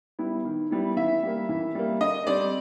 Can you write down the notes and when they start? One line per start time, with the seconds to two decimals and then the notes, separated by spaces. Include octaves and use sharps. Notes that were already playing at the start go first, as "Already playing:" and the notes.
0.19 G3 B3 E4
0.45 D#3
0.71 G3 B3 E4
0.97 E3 E5
1.23 G3 A#3
1.49 E3
1.75 G3 A#3
2.00 D3 D#5
2.27 G3 C4 D5